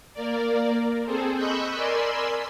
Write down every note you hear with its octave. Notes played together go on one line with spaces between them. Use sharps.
A#3 A#4 D5
C4 G#4 A4 C5
D#5 B5 C#6 E6 F#6 G6
A#4 D5 G#5 B5 C6 E6